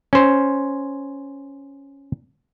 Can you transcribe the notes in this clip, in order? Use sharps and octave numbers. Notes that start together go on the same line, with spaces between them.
C#4 C5